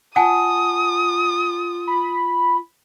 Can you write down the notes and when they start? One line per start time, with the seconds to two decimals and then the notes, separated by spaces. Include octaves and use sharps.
0.16 F4 F#5 G#5 A5 D#6
1.88 B5